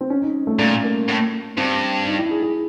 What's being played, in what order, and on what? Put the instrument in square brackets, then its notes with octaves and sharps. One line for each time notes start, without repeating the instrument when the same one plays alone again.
[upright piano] C4
C#4
D#4
A3
[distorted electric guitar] A#2 [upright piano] A3
[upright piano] A#3
[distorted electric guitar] A2
[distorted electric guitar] G2 [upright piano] C4
[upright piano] D#4
E4
G#4
G#4